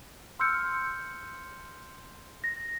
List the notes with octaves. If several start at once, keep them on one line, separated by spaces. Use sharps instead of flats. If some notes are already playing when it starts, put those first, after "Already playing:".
C6 E6 F6 G6 C#7
A#6